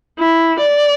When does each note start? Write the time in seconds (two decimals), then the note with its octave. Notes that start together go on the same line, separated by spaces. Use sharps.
0.19 E4
0.60 D5